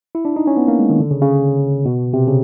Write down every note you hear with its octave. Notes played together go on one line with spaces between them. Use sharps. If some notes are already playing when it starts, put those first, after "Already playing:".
E4
D4
D#4
C#4
B3
A#3
G#3
D#3
D3
C#3
C#3
B2
C3
C#3